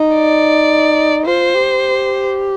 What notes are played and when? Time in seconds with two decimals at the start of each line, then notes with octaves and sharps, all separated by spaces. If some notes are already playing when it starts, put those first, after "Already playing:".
Already playing: D#4
0.15 D5
1.26 F4 C5
1.55 G4